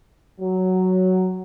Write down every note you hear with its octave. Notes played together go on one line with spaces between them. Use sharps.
F#3